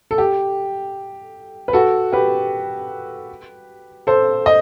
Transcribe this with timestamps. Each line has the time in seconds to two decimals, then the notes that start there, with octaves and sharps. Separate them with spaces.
0.11 A4
0.18 G4
1.68 B4
1.73 F#4 A4
2.13 G4 B4
4.07 A4 C5
4.46 D#5